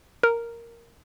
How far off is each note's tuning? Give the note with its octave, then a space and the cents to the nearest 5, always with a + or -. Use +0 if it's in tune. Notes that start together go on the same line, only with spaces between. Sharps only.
A#4 +0